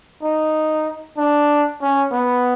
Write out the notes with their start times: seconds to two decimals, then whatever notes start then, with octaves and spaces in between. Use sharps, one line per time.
0.22 D#4
1.18 D4
1.82 C#4
2.12 B3